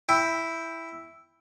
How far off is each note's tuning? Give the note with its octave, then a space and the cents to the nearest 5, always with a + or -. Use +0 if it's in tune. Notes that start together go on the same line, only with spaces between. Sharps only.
E4 +0 G5 +15